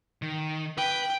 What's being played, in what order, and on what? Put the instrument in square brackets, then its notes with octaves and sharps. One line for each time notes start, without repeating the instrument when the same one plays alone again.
[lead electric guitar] D#3
[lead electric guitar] B4 [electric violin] G5